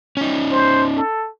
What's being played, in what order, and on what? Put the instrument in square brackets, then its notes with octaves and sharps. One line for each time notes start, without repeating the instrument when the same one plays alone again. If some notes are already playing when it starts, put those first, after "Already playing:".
[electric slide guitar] C#4 D#4
[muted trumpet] C5
A4